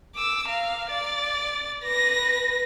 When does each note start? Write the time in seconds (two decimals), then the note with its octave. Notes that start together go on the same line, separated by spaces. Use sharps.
0.15 D6 E6
0.48 F5 A#5
0.90 D5 A6
1.83 B4 A#6